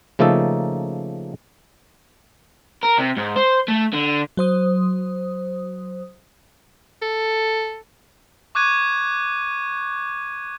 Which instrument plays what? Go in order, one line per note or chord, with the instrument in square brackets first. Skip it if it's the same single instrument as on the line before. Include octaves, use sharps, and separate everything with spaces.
[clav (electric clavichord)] C#3 F3 A3 A#3 D#4 A4
[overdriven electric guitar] A#4
C3
G#2
C5
A3
D3
[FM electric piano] F#3 C5 D#6
[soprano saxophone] A4
[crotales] C#6 D6 F#6 G#6 D#7